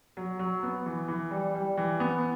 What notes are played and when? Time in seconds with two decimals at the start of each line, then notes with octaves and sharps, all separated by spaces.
0.17 F#3
0.39 F#3
0.63 B3
0.86 E3
1.08 E3
1.31 G3
1.55 G3
1.77 E3
2.00 B3